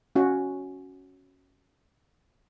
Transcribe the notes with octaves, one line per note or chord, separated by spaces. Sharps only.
C#4 F#4